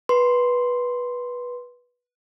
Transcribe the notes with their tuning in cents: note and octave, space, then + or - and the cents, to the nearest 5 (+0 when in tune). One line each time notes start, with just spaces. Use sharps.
B4 -15 C6 +0